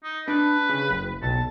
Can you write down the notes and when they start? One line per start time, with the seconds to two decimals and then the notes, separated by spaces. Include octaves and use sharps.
0.04 D#4
0.28 D4 B4
0.69 C#3
0.90 F#1
1.22 B1 A5